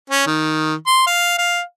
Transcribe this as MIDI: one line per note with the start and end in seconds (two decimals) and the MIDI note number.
0.10 0.25 61
0.27 0.74 51
0.87 1.06 84
1.07 1.36 77
1.38 1.61 77